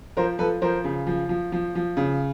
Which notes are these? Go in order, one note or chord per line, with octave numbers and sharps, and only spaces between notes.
F3 A#4 C5
F3 A4 B4
F3 A#4 C5
C#3
F3
F3
F3
F3
C#3